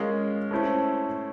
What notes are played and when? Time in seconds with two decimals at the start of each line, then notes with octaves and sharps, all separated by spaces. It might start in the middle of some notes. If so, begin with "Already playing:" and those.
Already playing: G#3 C#4 F4 A#4
0.51 A3 C#4 E4 A4 C5